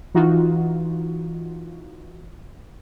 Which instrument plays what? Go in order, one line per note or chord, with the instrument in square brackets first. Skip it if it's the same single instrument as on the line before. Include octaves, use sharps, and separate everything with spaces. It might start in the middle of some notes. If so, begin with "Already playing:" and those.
[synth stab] E3 D#4 F4 F#4